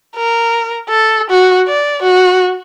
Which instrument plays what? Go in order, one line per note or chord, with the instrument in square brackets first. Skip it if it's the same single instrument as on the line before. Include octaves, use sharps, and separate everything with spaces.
[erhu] A#4
A4
F#4
D5
F#4